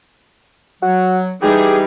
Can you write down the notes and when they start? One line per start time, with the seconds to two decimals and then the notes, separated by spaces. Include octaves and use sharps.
0.82 F#3 F#4
1.42 E3 G3 D#4 G4 G#4